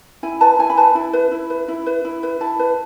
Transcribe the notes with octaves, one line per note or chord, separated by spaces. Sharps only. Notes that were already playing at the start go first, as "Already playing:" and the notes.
E4 G#5
B4 A5
E4 G#5
B5
B4 A5
E4 A5
B4
E4
B4
E4
B4
E4
B4
E4 A5
B4